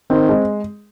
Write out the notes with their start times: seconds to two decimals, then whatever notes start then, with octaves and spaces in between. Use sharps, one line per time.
0.10 D#3 C4
0.29 G#3